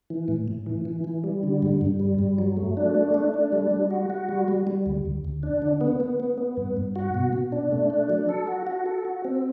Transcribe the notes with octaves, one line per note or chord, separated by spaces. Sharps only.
E3
A2
A2
E3
E3
E3
G3
D3
G2
G2
G3
G2
F#3
A3
D4
A3
A3
D4
G3
G3
F#4
F#4
G3
G3
G3
D2
D2
D2
D4
D3
B3
B3
B3
B3
G2
G2
F#4
B2
B2
D4
A3
D4
F#3
A4
F#4
F#4
A4
F#4
C4